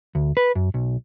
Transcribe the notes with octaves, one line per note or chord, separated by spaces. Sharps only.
D2
B4
F#2
B1